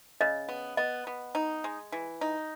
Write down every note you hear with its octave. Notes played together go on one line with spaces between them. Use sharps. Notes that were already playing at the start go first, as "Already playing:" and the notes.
C#3 D#5
B3
B3 D#5
B3
D#4
G#3
E3
D#4